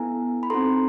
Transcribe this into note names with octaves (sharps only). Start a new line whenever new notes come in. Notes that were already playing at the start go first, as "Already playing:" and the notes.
Already playing: B3 E4 A4 G#5 A#5
B5
C4 D#4 F#4 A4 A#5 C6